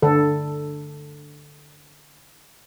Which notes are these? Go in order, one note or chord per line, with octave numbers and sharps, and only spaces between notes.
D3 A4